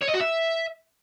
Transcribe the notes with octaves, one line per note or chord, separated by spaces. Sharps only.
C#5
D#5
F#4
E5